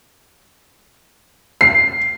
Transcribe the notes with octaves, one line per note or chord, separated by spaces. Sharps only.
C7